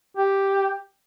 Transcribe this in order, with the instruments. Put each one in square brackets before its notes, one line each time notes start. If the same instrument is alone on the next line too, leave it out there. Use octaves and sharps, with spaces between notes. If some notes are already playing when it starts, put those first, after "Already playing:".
[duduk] G4